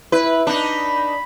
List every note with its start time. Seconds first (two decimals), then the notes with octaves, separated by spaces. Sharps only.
0.12 E4 B4
0.47 D4 D#4 B5